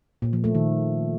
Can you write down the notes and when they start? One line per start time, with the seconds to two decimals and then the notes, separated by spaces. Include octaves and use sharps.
0.22 A#2
0.33 F3
0.44 A3
0.55 D#3